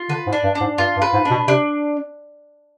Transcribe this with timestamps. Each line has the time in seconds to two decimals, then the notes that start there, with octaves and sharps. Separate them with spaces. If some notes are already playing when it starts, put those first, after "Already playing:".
Already playing: F4
0.09 D3 B4
0.27 G#2
0.33 D4
0.43 G2
0.55 D4
0.61 G#2
0.78 G2 F4
0.97 G2
1.02 B4
1.13 G#2
1.25 D4
1.31 B2
1.48 C3 D4